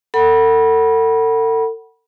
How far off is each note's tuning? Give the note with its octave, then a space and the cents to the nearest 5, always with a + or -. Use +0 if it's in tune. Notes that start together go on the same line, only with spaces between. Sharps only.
A4 +40 F#5 +25 B5 -25